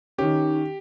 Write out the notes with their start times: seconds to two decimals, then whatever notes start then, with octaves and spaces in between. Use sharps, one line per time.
0.18 D#3 C#4 D#4 G4